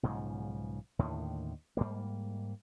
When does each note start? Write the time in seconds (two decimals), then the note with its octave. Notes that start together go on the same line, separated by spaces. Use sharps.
0.03 B1 G#2 C#3 F3
0.99 D#2 A2 D3 D#3
1.77 G#2 G3 A#3